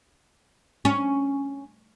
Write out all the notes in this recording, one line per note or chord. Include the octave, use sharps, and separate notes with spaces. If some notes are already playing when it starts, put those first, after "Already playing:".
C#4